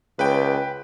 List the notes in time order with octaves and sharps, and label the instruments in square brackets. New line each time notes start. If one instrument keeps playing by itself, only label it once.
[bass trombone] C#2 [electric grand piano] B4 G5